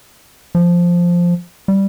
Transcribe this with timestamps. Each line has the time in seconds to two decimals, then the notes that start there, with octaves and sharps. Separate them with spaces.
0.55 F3
1.68 G3